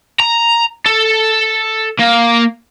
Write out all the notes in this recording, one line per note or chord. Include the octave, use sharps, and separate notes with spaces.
A#5
A4
A#3